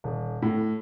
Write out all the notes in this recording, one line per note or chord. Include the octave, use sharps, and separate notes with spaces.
D#1
A2